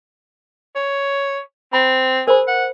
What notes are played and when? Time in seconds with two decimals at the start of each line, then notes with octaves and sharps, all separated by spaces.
0.75 C#5
1.73 C4 B5
2.28 G#4 A#4 C5 B5
2.48 F#5